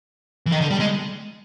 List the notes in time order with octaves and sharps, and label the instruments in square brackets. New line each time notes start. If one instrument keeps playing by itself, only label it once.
[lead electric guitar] E3
D#3
D3
G3
G#3